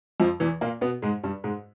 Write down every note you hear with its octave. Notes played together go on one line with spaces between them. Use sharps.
F2 F3
E2 E3
A#2 A#3
B2 B3
G#2 G#3
G2 G3
G#2 G#3